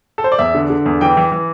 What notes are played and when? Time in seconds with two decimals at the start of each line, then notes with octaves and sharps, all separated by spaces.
0.18 A4
0.24 C5
0.32 D5
0.39 E2 E5
0.55 D3
0.70 D3
0.86 E2
1.01 E3 G5
1.17 E3
1.32 E3